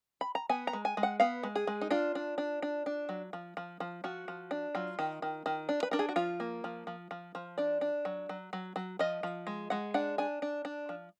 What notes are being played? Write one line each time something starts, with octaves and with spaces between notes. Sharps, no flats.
B5
A#5
B3 G#5
A#5
G#3
G#5
G#3
F#5
B3 F5
G#3
G#4
G#3
D#4
D4 F4
D4
D4
D4
D4
F#3
F3
F3
F3
F3 F#4
F3
D4
F#3 F4
D#3
D#3
D#3
D4
B4
D4 A#4
G#4
F#4
F3 F4
A#3
F3
F3
F3
F3
D4 D5
D4
F#3
F#3
F#3
F#3
F3 D#5
F3
G#3
G#3 F#5
D4 F#5
D4 G#5
D4
D4
F3